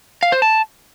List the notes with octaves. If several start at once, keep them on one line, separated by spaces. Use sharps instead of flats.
F5
C5
A5